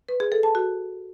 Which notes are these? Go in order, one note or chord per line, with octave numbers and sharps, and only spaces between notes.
B4
G#4
A4
A5
F#4